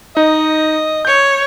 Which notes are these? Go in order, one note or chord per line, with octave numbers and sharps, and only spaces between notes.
D#4 D#5
C#5 G6